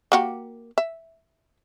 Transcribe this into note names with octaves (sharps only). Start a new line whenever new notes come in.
A#3 F#4 G4
E5